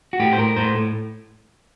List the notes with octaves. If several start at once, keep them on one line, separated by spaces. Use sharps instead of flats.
F#4
A2 G4
C5
A2 A#4
A2 C5
A2